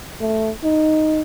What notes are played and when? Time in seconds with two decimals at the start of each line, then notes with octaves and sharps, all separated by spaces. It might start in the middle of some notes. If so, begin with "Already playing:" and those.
0.21 A3
0.64 D#4